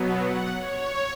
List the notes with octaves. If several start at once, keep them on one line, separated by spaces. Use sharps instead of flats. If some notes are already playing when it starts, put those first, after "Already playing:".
Already playing: B2 F#3 B3
F#5
C#5